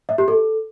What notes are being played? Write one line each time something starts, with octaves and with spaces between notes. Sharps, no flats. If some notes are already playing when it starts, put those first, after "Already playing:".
E5
G4
A4